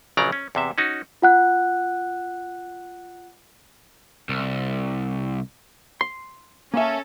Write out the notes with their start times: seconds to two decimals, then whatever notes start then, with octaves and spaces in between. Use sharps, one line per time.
0.17 A#1 C#3 F#3 D5 A#5
0.32 C#4
0.55 E2 C3 E5
0.78 C#4 D#4 F#4
1.22 F4 F#5 F#6
4.29 C2
6.01 C6
6.74 A#3 C#4 A4 E5